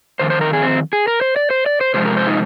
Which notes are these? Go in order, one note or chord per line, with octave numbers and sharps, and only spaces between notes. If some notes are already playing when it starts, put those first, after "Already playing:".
F2 D#3 C5
C5
A#4
G#4
C4
G#4
A#4
C5
D5
C5
D5
C5
C3 F3 G#3 C5
A#4
C5
D#4